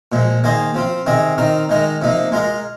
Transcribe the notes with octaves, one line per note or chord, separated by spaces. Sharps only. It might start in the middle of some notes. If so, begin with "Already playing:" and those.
A#2 F3 G#3
D#3 A#3 G#4 C5 D#5
F3 C4 F4
C3 D#3 C4 G#4 D#5
D#3 C4 D#4 A#4
D#3 G#3 D#4 A#4
C3 F3 A#3 D#4
G#3 F4 A#4 D#5